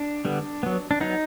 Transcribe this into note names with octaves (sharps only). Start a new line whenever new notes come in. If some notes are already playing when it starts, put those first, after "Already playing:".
Already playing: D4
D3 G3 B3
F#3 B3
D4
F#3 B3 D#4